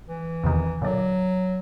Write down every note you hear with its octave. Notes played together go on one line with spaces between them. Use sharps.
E3
E2 C3 D#3
A#2 D3 F#3 D5